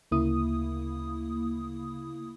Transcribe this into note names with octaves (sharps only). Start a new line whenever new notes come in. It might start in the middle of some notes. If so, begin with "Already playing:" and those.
D2 C#3 A#3 E4 D#6